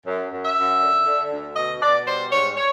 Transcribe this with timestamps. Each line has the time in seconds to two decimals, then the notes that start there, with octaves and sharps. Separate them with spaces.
0.06 F#2
0.31 F#2
0.44 E5
0.57 F#2
0.81 D3
1.06 D3
1.31 D2
1.56 B2 D#5
1.82 B2 D5
2.07 G3 C5
2.31 G#2 C#5
2.57 C#5